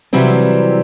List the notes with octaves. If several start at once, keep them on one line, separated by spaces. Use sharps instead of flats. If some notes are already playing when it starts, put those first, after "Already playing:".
C3 E3 F#3 G3 C4